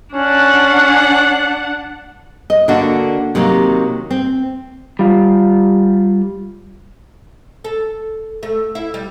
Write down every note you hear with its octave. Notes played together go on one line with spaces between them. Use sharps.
C#4 D4 F#5
D#5
D3 A#3 D4 F#4
C3 D#3 F#3 A#3
C4
G3 F4
A4
A3
E4
G3